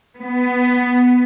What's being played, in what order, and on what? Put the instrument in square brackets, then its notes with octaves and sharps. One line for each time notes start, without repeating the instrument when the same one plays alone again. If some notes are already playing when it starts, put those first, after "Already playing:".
[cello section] B3